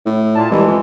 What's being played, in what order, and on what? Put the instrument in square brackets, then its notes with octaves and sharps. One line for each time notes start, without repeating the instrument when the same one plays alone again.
[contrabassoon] A2
[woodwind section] A#2 A5
[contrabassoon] C2 [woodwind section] E3 G#3
[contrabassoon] F2